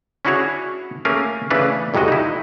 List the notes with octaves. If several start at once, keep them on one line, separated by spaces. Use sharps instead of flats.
C#4 D4 E4 F#4 G#4 C#5
A3 A#3 C#4 G#4 A#4 F5
C#3 E3 A3 C#4 D4 B4
C2 F2 C3 G#3 F#4 D#5
D#4 E4